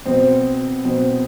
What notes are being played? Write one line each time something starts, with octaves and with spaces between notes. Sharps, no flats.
B2 C4
B2 C4